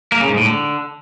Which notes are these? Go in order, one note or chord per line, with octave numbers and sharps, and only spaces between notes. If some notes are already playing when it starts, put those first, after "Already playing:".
A#3
C#3
G#2
A2
D3